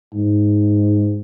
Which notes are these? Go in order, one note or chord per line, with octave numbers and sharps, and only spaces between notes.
G#2